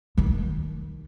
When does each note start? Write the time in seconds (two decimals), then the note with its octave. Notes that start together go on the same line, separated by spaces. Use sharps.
0.17 D#3 D#4